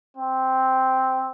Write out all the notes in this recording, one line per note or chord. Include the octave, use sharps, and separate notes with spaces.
C4